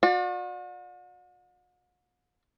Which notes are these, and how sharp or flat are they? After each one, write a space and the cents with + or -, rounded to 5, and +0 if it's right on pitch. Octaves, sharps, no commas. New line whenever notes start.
F#4 -45 D5 +15